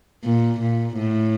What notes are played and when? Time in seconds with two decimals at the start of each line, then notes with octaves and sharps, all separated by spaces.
0.24 A#2
0.61 A#2
0.98 A2